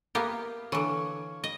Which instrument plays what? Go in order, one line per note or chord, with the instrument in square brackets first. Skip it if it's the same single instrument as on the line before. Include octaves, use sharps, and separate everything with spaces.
[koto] A#3 B3 G4 [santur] F5
[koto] D3 E3 [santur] C#5
[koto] D#5